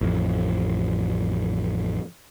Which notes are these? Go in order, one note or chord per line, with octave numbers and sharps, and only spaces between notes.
A1 F2